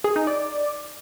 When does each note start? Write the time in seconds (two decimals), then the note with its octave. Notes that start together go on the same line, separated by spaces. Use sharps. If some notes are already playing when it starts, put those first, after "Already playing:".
0.04 G#4
0.16 D#4
0.27 D5